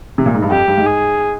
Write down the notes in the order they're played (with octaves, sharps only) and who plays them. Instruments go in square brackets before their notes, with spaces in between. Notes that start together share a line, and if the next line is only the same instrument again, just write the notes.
[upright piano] C3
A#2
G#2
G2
[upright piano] F2 [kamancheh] G4
[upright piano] G2
G#2
[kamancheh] G#4